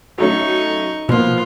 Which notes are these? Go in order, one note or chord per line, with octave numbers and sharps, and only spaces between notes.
F#3 A3 C#4 D#4 C#6
B2 F3 A#3 B3 F4